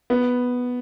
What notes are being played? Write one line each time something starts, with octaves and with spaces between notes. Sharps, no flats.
B3